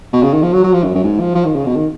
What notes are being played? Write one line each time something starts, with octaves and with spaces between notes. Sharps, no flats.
B2
C#3
D#3
F3
F#3
F#3
F3
F#2
F#2
G#2
F3
F3
D#3
C#3
B2
D#3